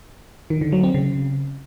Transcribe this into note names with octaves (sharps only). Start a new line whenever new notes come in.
D#3
D3
F#3
C4
C#3